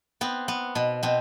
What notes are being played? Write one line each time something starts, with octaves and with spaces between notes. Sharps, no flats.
B3 C4
B3
B2
B2 C4